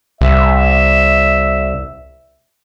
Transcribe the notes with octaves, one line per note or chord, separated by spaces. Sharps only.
C2 E5